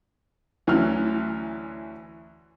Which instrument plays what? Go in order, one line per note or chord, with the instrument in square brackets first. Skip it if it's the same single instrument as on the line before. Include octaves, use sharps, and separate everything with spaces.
[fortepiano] D2 E3 F#3 C#4 E4 F6